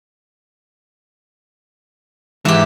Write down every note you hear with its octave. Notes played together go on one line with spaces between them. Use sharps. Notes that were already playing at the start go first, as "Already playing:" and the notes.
G#2 E3 G#3 G4